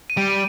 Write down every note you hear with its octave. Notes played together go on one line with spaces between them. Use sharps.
D#7
G3 D7
D#7